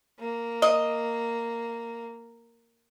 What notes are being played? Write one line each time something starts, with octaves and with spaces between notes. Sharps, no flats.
A#3
D#5